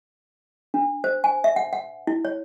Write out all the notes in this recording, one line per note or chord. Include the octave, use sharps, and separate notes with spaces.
D4
C5
G#5
E5
F#5
F#5
E4
C#5